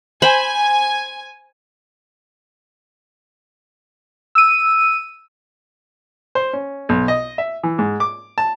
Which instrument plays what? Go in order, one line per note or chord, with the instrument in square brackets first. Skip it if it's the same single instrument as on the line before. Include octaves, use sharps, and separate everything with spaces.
[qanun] C5 B5 [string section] G#5
[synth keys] E6 D#7
[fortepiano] C5
C#4
B1
D#5
E5
E3
G#2
D6
A5